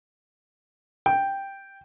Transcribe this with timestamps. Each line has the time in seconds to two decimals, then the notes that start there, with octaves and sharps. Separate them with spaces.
1.06 G5